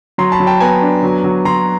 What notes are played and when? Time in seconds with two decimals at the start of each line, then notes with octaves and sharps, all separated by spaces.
0.18 F#3 A#5 C6
0.32 A5 B5
0.40 F#3
0.47 G5 A5
0.60 B3 G#5 A#5
0.82 D4
1.03 F#3
1.24 F#3
1.45 F#3 A#5 C6